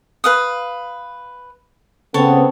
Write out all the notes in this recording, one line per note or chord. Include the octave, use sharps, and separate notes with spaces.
B4 F5 D#6
C#3 B3 C4 A4 C#5 A5